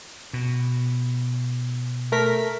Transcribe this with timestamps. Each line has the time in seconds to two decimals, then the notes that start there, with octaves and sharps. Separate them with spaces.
0.33 B2
2.12 A3 A#4 B6